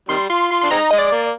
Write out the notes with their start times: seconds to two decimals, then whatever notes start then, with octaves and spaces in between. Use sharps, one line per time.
0.09 C3 D#3 G3 C6
0.29 F4 C6
0.50 F4 C6
0.61 D4 C6
0.71 G#3 C4 D#4 A#5
0.91 G#3 D#5
0.98 D5
1.12 A#3